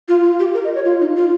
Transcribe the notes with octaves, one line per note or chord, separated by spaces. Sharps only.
F4
F4
G4
A#4
D#5
C#5
F4
D#4
F4